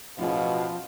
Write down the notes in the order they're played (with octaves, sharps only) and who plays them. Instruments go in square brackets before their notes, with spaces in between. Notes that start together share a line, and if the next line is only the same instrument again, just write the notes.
[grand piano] A1 F4 G#4 [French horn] B2 [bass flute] F3 [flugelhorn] F5